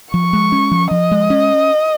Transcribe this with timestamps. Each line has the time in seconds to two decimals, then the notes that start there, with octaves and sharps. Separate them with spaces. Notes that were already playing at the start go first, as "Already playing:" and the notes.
0.13 F3 C#6
0.33 G#3
0.52 C#4
0.71 F3
0.91 F3 D#5
1.11 G#3
1.30 C#4